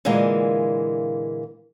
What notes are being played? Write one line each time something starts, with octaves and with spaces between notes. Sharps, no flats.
A#2 D3 E3 G#3 A#3